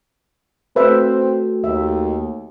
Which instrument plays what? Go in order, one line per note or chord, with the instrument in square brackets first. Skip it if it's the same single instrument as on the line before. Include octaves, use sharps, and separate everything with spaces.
[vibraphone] A3 F#4 A4 [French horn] C4 [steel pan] B4 C5 E5
[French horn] D#2 [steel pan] E5